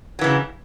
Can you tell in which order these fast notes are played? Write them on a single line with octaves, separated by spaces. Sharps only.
F#3 E3 C#3